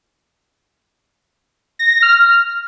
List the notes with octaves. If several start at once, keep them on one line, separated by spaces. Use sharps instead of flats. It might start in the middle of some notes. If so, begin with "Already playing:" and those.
A#6
A#6
F6